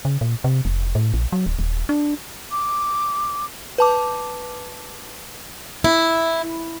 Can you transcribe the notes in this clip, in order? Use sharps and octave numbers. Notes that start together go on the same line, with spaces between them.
C#3
A#2
C3
F1
A2
A#1
F#3
D1
D#1
D4
D6
B4 A5 D6
E4